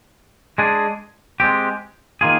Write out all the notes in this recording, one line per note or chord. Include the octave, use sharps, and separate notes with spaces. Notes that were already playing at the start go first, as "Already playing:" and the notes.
G#3 D4 G#4
G#3 C4 G4
D#3 A#3 F4 G#4